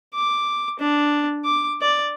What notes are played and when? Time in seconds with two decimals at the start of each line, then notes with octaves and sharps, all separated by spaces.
0.15 D6
0.80 D4
1.45 D6
1.82 D5